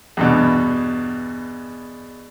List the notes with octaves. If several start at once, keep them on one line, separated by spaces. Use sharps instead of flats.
E2 G2 B2